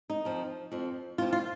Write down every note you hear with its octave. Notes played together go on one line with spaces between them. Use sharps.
D#4
F2 F3
F2 F3
F2 F3 F4
F4